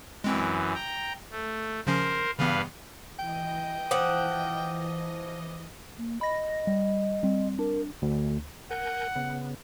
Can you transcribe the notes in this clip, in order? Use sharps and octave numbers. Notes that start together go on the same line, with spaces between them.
F#2 E3 G#3 C4
G5 A#5
A3
C#3 F3 C#4 A#4 C5
G2 C#3 E3 B3 B4 F5
E3 D#5 G5
F3 C5 F#5 D6 D#6
A#3
D#5 B5 A#6
G3
G3 C4
D4 A#4
D2
A#4 F#5 G#5 G6
C#3 B3